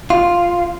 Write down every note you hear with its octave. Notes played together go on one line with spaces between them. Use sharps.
F4